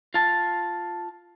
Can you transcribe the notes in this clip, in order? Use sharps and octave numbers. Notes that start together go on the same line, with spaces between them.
F4 A5